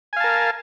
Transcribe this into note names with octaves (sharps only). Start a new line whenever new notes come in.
A#4 F5 G#5 A5